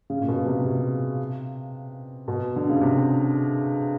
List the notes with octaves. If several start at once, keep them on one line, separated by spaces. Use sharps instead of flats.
C#3
A#2
B2
C3
C3
B2
D3
C#3
C3